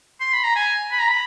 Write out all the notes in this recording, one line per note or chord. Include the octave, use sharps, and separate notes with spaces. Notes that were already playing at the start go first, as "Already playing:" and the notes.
C6
B5
A#5
G#5
B5
A#5
B5